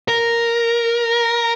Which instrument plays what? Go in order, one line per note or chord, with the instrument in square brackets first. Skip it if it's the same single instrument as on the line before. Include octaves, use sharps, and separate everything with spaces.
[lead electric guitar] A#4